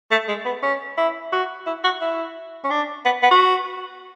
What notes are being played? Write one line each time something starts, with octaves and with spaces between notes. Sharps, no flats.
A3
G#3
B3
C#4
E4
F#4
E4
F#4
E4
C#4
D4
B3
B3
F#4